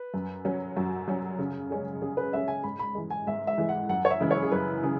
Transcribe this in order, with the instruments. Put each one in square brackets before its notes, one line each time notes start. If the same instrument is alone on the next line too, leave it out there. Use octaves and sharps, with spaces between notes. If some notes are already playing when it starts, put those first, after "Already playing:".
Already playing: [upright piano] B4
[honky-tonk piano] F#2
F#3 C#4
[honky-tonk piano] F#2 [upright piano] F#4
[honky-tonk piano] F#3 C#4
C#3
G#3 C#4 G#4
[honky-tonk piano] C#3 [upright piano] G#4
[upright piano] B4
[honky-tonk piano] G#3 C#4 G#4 [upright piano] E5
[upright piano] G#5
[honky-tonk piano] G#2 [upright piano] B5
[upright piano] B5
[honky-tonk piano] E3 G#3
[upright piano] G#5
[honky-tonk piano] G#2 [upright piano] E5
[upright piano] E5
[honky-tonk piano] E3 G#3
[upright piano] F#5
[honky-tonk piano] F#2 [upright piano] F#5
[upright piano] C#5
E5
[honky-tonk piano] C#3 E3 G#3 E4
[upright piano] C#5
G#4
[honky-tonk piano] F#2 [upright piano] B4
[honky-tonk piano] C#3 [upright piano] G#4